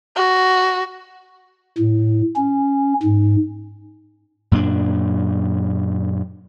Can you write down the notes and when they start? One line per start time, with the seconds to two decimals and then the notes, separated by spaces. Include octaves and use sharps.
0.16 F#4
1.78 A2
2.36 C#4
3.03 G#2
4.52 F#2 A#2 C4 D4